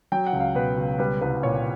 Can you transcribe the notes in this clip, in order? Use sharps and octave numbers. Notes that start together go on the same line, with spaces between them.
F#3 G5
F#5
C#2
F5
B2 B4
C#2
G3 B4
C2 B4
A#2 C#5